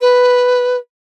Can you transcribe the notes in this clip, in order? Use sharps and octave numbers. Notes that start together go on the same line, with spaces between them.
B4